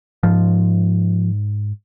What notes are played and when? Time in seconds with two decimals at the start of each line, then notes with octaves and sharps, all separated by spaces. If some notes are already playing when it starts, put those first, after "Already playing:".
0.23 G#2 F3